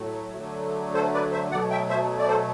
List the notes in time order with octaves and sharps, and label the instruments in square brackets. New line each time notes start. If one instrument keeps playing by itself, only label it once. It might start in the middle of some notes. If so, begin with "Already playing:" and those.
Already playing: [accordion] A2 F#3 A3
D3 F#3 A3
A4 C5
B4 D5
C5 E5
B2 F#3 A3 D5 F#5
E5 G5
C5 E5
D5
A4 C5